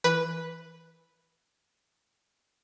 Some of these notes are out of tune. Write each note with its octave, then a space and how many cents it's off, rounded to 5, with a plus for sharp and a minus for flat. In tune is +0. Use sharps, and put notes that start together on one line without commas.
E3 +5 B4 +0